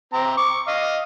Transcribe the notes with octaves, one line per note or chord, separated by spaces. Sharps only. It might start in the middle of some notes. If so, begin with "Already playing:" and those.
C4 A#5
C#6 D6
D#5 F5